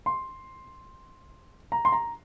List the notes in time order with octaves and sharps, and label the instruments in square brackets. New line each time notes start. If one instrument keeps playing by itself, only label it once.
[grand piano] C6
A#5
C6
A#5